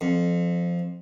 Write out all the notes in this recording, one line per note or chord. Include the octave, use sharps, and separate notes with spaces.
F2